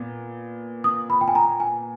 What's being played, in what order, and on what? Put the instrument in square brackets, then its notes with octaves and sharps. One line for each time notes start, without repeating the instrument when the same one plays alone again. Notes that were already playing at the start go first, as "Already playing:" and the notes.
Already playing: [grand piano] A#2 B3
[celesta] D#6
B5
G5
G#5
A#5
G#5